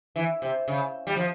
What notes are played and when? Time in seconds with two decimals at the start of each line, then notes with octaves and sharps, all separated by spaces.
0.16 E3
0.42 C3
0.68 C#3
1.07 G3
1.16 F3